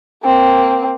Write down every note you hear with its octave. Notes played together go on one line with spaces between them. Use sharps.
A#3 C4